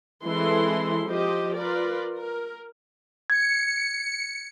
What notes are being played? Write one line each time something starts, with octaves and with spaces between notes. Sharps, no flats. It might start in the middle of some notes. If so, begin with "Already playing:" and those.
E3 G#3 C4 E4 A4 C6
F3 G4 C5 D#5
F4 A#4 B4 D5
A#4
G#6 C#7